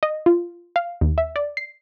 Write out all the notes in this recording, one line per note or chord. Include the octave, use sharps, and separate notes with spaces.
D#5
F4
F5
D#2
E5
D5
C7